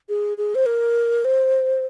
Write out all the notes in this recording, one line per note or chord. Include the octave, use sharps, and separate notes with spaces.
G#4
G#4
C5
A#4
C5